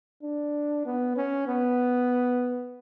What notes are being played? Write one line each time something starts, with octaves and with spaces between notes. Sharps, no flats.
D4
B3
C#4
B3